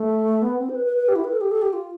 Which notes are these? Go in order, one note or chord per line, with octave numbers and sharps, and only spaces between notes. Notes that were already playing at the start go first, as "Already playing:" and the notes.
Already playing: A3
B3
C4
C5
B4
B4
B4
G4
E4
B4
A4
G4
A4
G4
F4